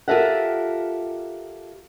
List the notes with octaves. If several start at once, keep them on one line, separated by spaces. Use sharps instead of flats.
F4 G4 A4 A#4 E5 F#5